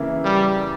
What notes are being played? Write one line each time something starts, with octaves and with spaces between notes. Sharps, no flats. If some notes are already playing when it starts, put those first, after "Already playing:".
Already playing: C#3 E3 A#3 E4
G3